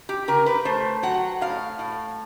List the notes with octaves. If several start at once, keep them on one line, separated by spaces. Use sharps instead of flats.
G4
C#3 A#4
B4
A3 C5
F#3 F#5
A2 F5
A2